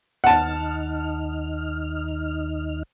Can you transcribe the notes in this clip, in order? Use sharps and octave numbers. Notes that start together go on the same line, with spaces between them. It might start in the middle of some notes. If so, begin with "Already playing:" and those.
D#2 D#4 F#5 A5 F6